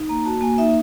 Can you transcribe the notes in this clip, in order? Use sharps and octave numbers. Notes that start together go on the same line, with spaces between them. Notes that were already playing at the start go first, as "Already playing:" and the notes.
Already playing: D#4
A#3 A#5
F#4 A5
A#3 G#5
D#4 E5